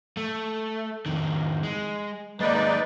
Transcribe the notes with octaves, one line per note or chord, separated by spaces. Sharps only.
A3
F2 D#3
G#3
G#3 A#3 D#4 B4 D5